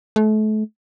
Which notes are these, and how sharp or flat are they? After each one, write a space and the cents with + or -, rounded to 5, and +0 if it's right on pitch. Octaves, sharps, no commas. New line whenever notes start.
A3 -35